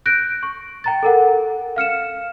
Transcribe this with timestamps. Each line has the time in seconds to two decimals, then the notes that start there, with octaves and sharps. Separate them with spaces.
0.06 F#6 G6 A#6 D7
0.43 C#6
0.84 G5 A#5 A6
1.03 A4 A#4 F#5
1.76 F5 F6 C#7 E7